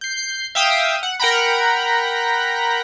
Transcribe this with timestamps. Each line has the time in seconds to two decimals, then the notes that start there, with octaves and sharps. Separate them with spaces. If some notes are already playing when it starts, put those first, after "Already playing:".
0.01 G6 C7
0.55 E5 F5 G5 D#6 E6
1.03 F#5
1.20 A#4 F#5 G5 A#5 B5